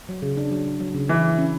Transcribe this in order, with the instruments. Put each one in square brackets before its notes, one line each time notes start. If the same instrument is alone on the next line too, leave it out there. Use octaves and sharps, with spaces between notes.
[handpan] F#3
C#3
D4
F#3
F#3
F#3
C#3
[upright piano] E3 [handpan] E4
[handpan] E4
C#4